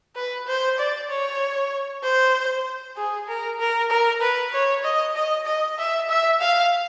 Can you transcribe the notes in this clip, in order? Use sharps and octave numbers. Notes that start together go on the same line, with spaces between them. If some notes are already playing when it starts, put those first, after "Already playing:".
B4
C5
D5
C#5
C5
G#4
A#4
A#4
A#4
B4
C#5
D#5
D#5
D#5
E5
E5
F5